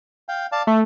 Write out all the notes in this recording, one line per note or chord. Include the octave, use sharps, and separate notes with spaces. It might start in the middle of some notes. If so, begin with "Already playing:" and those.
F5 G5
D5 F5 A5
A3 E5